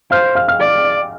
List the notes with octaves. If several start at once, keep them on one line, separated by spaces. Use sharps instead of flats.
C5 F5 F6
F5 F6
F5 F6
D5